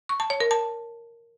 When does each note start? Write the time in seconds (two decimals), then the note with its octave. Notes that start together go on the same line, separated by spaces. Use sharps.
0.09 C#6
0.20 A5
0.30 C#5
0.40 A#4
0.51 A5